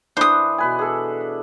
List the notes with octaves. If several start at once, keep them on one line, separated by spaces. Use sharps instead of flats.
E3 D4 B4 C5 D#6
B2 B4 G#5
G#4 A4